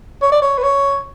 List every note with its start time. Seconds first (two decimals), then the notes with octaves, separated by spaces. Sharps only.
0.22 C#5
0.32 D5
0.42 C#5
0.58 B4
0.63 C#5